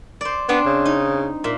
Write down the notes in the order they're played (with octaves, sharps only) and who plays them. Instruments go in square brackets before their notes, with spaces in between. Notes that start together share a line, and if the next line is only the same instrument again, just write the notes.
[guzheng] C5 D5
[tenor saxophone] B3 [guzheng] C4 D4
[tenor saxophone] C#3
[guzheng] D#4
A#2 E5